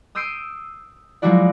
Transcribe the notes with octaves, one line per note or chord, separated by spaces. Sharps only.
D#6 E6 G6 C7 D7 D#7
F3 F#3 G#3 E4 F#4 D5